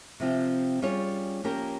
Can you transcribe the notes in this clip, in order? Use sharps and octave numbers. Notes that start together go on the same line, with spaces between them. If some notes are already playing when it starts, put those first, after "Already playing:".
C3 F3 C4 F4
G3 C#4 F4 G#4 C#5
F3 A#3 C#4 G4 A#4